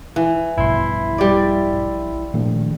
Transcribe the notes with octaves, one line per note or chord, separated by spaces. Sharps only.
E3
A#1 G2 B2 E4 C6
G3 D5
A#1 A#2 D#3 A3